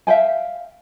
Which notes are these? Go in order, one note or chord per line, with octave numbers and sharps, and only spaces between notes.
E5 F5 G5 G#5